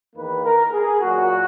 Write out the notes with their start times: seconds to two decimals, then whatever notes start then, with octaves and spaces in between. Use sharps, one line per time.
0.15 E2 D#3 A#3 B4
0.44 A#4
0.72 G#4
1.01 A#2 F#3 A#3 F#4